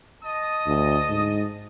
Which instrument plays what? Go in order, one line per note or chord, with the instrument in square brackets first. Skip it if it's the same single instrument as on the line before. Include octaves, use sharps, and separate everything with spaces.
[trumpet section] D#5 A5 D#6
[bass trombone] D2
G#2